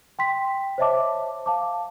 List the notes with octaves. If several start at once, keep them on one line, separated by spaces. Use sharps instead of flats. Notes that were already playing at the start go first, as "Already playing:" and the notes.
G5 C6 B6
C5 C#5 D#5 E5 A5 D6
F5 A5 D6